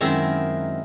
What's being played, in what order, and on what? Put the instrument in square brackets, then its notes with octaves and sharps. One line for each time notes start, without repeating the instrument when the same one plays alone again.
[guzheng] F#2 D#3 G#3 C4 E4